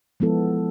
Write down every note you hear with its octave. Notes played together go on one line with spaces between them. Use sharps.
F3 G#3 B3 E4 A4